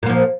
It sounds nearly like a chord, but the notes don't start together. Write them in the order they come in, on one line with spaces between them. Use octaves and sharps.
A#2 A#3 F3